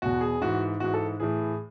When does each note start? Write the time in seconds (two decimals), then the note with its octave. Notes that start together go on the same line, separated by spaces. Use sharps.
0.02 E2 B2 F#4
0.21 G#4
0.41 G#2 E3 F#4
0.80 G#2 E3 F#4
0.94 A4
1.20 A2 E3 G#4